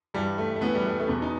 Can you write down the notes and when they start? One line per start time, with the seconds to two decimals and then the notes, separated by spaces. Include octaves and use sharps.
0.14 G2 E3 G3
0.38 A3
0.56 A3
0.61 A2 E3 B3
0.75 G3
0.85 A3
1.00 A3
1.08 E2 B2 B3
1.22 D#4